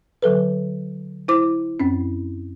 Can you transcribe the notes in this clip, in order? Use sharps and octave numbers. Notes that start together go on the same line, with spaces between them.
D3 F#3 A4 B4
E4 C5 D6
F#2 C4 C#4